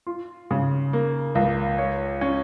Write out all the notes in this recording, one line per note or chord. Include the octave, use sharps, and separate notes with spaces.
F4
C#3
A#3
C#2
C#5
C#4